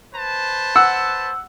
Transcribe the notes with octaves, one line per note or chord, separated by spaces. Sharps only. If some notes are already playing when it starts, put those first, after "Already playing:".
B4 C5 A5
F#5 E6